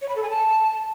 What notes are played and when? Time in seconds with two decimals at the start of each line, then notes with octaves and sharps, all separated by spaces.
0.02 C#5
0.09 B5
0.16 A4
0.23 G#5
0.30 A5